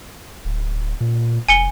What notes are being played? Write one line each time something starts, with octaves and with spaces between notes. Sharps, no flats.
D1
A#2
F1 G#5 C#7 G7